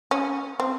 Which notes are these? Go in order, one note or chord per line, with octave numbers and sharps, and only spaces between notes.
C#4
C4